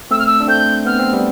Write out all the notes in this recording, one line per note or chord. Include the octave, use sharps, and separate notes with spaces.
A3 C4 E6
F6
E6
D4
A3 C4 G6
B3 F6
C4
G3 B3